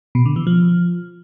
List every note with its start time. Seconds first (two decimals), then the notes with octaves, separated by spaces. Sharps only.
0.15 B2
0.26 D3
0.36 E3
0.47 F3